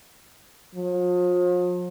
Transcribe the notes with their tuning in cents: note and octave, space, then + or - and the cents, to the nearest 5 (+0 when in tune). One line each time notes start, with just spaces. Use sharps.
F3 +40